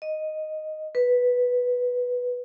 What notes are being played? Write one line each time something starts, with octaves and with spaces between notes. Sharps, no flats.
D#5
B4